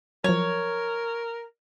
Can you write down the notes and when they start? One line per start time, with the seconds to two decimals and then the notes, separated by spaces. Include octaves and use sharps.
0.24 F3 F#3 A#4 C#5